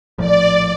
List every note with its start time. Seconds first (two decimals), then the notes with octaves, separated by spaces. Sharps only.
0.18 A#1 A2 F3 A3 D5